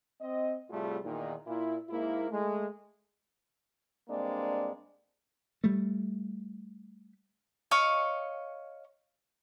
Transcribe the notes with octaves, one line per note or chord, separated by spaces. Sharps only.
C4 D#5
A2 C3 G3 A3 F4 G#4
E2 A#2 D#3
A#2 E4
G#2 A#3 E4
G#3 A3
G2 G#3 A#3 C4 D4 D5
G3 A3
C#5 D#5 F5 C#6